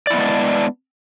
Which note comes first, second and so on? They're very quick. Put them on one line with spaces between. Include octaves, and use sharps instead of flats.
D5 E4 B3 G#3 D4